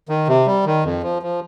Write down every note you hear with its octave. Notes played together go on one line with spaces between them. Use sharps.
D#3
C3
G3
D#3
F2
F3
F3